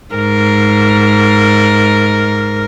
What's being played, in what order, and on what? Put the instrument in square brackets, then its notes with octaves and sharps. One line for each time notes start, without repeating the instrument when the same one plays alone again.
[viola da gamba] G#2 A#4